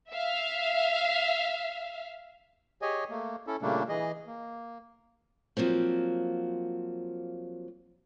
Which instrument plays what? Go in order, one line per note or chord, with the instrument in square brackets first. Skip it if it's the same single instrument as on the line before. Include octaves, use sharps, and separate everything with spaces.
[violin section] E5 F5
[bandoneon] G4 G#4 C#5 D#5 G#5
A3 A#3
C#4 E4 A4
A#2 C#3 G3 A3 A#3 D4
E3 G#4 D#5
A#3
[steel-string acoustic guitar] F3 F#3 A#3 C4